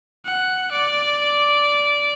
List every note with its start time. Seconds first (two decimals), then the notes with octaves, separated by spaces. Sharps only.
0.25 F#5
0.72 D5